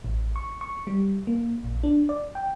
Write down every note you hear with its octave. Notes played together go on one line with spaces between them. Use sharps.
A1
C#6
C#6
G3
A#3
A#1
D4
D5
G5